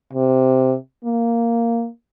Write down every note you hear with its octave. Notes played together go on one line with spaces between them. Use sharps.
C3
A#3